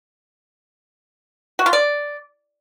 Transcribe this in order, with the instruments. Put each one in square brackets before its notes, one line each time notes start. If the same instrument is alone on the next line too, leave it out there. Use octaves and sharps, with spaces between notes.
[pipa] F#4
F4
D5